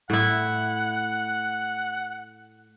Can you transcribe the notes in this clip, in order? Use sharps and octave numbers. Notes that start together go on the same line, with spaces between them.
A2 E4 F#5